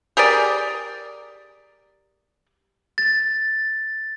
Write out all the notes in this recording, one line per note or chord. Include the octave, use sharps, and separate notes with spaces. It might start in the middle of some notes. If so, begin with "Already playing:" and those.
G4 G#4 A#4 D5
A6